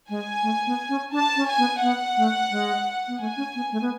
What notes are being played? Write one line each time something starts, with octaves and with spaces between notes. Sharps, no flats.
G#3 G#5
A3
B3
C#4
D4 A5
C#4
G#5
B3
B3 F#5
A3
G#3
B3
A3 G#5
C#4
B3
A3
B3